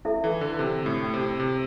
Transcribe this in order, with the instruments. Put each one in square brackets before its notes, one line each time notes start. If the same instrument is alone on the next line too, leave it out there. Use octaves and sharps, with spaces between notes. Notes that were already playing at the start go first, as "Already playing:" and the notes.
[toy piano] E4 A4 E5
[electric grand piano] E3
D3
C3
A2
C3
C3